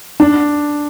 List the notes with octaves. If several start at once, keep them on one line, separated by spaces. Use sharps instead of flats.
D4